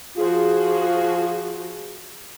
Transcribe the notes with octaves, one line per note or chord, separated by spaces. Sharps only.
F3 F4 F#4 G#4